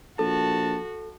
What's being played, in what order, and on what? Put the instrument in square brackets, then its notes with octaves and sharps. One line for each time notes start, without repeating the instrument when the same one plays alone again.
[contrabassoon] A#1 [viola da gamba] F#4 [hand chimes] A4 [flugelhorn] A5